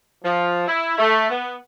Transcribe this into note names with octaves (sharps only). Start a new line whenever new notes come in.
F3
E4
A3
B3